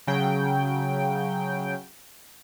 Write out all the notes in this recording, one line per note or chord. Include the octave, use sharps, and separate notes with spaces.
C#3 F#3 G5